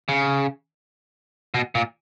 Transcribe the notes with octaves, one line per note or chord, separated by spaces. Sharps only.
C#3
B2
A#2